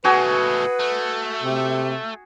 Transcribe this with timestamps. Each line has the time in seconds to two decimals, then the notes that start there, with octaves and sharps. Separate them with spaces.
0.04 B2 A3 F#4 G#4 B4 G#5
0.79 A3
1.43 C3